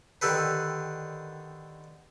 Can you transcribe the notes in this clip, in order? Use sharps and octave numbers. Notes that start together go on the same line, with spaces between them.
D3 D#3 G4 A4 B4